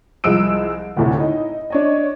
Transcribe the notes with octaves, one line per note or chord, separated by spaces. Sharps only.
C2 F3 G#3 E6 D7
D2 A2 C3
D#4 E4
D4 C#5 D#5